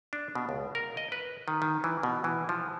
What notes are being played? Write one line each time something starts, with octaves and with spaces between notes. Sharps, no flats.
D4
B2
C#2
A#4
D#5
B4
D#3
D#3
E3
B2
E3
F3